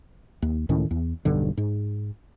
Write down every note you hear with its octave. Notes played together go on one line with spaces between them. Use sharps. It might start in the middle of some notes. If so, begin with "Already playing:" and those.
D#2
C#2 A2 D#3 C#4
E2
E1 B1 G2 D3
G#2